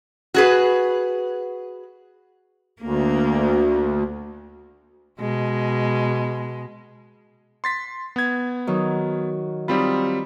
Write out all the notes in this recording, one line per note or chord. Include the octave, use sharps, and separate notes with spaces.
F#4 G#4 B4
D2 A#3
B2 G#3
C6 A6 B6
B3 G#6
D#3 F#3
G3 C4 D#4 F4 B5